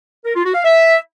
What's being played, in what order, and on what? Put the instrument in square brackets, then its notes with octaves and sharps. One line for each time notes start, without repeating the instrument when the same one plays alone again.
[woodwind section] A#4
F4
F#4
F5
E5